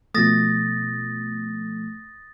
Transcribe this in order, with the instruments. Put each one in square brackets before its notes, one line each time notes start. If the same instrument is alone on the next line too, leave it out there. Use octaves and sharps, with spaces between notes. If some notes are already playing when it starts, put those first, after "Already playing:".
[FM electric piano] B2 F3 A3 [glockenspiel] D#6 A6 A#6